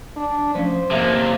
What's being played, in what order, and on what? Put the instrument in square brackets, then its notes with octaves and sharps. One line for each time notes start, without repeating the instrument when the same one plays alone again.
[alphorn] D4
[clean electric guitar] F3 A3 C#4 [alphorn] C5
[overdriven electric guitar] C3 A#3 [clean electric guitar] C#5 D#5 E5